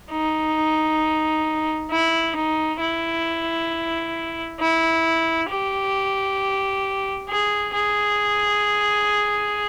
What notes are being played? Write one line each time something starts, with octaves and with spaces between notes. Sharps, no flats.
D#4
E4
D#4
E4
E4
G4
G#4
G#4